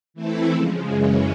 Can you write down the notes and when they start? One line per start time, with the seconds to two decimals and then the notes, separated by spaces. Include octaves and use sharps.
0.14 E3 A3 C4 E4 A4
0.51 C#3 F3 G#3
0.87 F#2 C#3 E3 G#3 C#4